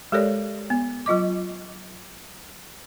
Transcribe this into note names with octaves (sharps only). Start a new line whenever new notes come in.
G#3 G4 A4 A#4 C#5 D5
B3
F#3 F4 D#5 D6